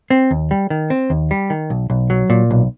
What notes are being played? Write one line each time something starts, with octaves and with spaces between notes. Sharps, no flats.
C4
D#2
G3
D#3
C4
D#2
G3
D#3
B1
B1
F#3
A#2
B1